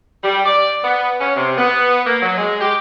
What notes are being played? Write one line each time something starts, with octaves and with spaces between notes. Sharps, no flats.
G3
D5
B3
C#4
C3
B3
A#3
F#3
G#3
G4